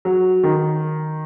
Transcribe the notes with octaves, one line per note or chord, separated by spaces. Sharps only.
F#3
D#3